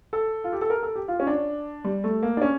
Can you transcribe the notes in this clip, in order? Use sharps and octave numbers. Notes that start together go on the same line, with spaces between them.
A4
F4
G4
A4
A#4
A4
G4
F4
C#4
D4
G3
A3
A#3
D4
C#4